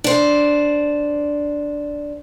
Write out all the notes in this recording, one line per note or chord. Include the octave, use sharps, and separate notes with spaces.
D4 C5